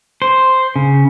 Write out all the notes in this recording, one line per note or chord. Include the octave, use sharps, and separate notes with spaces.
C5
C#3